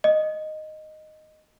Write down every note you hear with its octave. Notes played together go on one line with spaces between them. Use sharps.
D#5